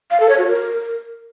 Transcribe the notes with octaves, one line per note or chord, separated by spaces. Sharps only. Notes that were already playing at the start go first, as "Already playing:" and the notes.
F5
A4
C#5
F#4
A#4